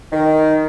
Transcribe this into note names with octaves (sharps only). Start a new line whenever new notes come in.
D#3